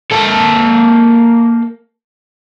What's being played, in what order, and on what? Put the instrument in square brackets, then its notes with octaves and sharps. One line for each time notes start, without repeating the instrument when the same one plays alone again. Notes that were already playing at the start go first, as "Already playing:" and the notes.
[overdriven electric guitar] A#3 A4